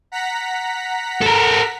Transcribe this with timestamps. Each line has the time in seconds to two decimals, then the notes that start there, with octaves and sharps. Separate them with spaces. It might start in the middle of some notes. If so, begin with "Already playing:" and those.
0.12 F#5 A#5 B6
1.21 A4 A#4